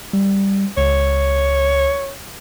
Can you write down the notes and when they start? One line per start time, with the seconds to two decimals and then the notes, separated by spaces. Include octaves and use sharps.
0.13 G3
0.77 C#2 C#5